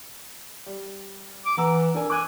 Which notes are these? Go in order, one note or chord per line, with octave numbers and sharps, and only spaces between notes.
G3
D6
E3 F#5 A#5 E6
D4 A#4 G#5
G#5 D6 F#6